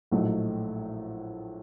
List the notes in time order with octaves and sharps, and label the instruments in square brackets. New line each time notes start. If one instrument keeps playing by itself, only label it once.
[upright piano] A#1 A2 F#3 A3 D#4